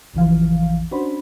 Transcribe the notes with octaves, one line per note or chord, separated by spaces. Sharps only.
A1 E2 C#3 E3 F3 F5
C#4 D4 F#4 C5 B5